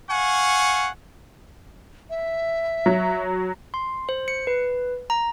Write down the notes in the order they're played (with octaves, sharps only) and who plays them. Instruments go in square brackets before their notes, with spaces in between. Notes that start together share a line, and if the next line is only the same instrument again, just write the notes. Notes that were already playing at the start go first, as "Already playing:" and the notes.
[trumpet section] F5 F#5 G#5 C#6
[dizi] E5
[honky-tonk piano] F#3
[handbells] C6
C5
C#7
B4
A#5